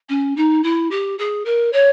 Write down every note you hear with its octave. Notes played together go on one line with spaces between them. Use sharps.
C#4
D#4
E4
G4
G#4
A#4
C#5